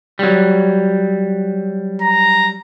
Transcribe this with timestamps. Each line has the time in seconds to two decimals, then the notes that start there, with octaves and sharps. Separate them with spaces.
0.19 F#3 G3
2.01 A#5